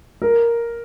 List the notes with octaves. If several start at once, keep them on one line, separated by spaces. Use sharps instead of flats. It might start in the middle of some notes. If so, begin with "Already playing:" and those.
A#4